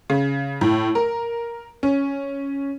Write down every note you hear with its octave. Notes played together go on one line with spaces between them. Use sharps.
C#3
A2
A#4
C#4